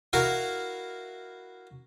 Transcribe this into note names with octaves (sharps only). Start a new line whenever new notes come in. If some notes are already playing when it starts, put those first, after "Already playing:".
E4 F#4 A#4 F5